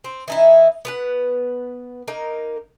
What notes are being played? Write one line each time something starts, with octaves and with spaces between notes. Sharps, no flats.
C4
E3 D#4 E4
B3 B4 F#5
A#3 D#4 A#4